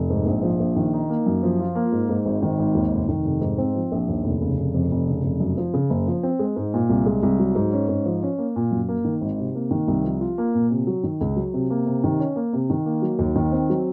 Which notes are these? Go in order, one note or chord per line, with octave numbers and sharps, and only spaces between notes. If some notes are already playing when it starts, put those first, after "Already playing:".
Already playing: F1
G#2
A#1
F3
A#1
D#3
D#4
A#3
F#2
F3
F4
A#3
G#2
G#2
G#1
D#3
G#1
D#2
F1
D#3
F1
G#2
C4
F3
A#1
D#2
F1
C#3
F1
F2
F1
C#3
F1
F#2
F3
C#3
F#1
F3
C4
G#3
G#2
A#2
C2
G#3
C2
F#3
G#2
C#4
G#2
F3
C#4
A#3
A#2
F#2
A#3
D#3
G#1
C3
A#3
D#3
C2
F3
F4
A#3
A#2
C3
F#3
D#3
C#2
F#3
C3
A#3
C3
D#3
C#4
A#3
C3
D#3
A#3
F#3
D#2
D#3
C4
F#3